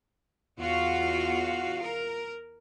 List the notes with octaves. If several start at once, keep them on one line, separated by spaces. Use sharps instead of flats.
E2 F4 F#4 F5
A#4